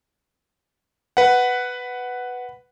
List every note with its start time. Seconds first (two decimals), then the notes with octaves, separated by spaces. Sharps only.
1.17 B4 F#5